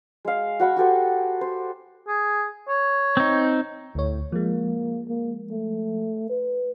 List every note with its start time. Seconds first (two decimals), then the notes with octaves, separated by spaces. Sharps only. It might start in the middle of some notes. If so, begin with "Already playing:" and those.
0.25 G#3 F5
0.60 F#4 F#5 B5 C#6
0.76 F#4 G4 A4 C5
1.41 C5
2.08 G#4
2.69 C#5
3.17 C4 D#4
3.95 D2 A2 C#5
4.32 F3 G#3 A#3
5.09 A#3
5.51 A3
6.30 B4